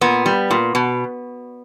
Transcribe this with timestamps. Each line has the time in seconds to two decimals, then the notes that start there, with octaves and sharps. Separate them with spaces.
0.01 A#2 B3
0.26 G3
0.51 A#2
0.75 B2